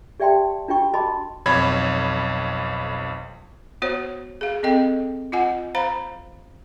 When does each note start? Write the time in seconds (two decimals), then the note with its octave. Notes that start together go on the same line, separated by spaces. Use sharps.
0.20 G4 D5 E5 G5 A5 C6
0.68 D4 F4 F#4 G5 C#6
0.94 F#4 D#5 A5 B5 C6 D6
1.46 B1 F2 C#5 B5 G#6
3.82 B3 F#4 C5 C#5
4.41 G#4 F5
4.63 C4 A4 D#5 G5
5.32 F4 D#5 F#5 G#5
5.75 C5 F5 A#5 B5